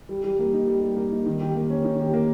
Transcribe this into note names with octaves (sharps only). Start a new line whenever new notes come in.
G3
G3
A#3
D#4
G3
G3
A#3
D#4
D#3
G4
A#3
C#4
D#3
G4
A#3